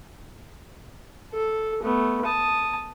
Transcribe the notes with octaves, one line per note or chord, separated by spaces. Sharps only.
A4
A3 B3
A5 D#6